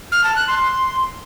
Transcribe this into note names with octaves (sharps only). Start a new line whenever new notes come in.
F6
A5
F#6
C6